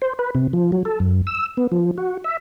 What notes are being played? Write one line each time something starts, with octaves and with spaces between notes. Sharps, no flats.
C5
B4
C3
F3
F#3
A4
F#2
E6
B3
F3
F#4
E5